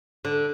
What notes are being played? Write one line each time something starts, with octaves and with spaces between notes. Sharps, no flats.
D3